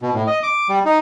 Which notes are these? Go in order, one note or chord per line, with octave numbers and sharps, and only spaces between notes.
B2
A2
D#5
D6
G3
D#4